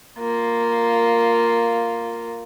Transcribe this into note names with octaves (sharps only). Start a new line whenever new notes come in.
A#3 F4